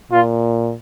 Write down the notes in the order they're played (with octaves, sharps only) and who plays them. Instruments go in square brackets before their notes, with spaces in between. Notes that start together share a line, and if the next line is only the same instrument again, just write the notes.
[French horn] A#2 [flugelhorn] F4